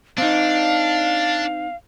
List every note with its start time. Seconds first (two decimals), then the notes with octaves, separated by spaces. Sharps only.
0.18 C4 D4 D#4 F5